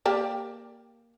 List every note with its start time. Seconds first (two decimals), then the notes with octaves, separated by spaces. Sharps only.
0.06 A#3 G4 D5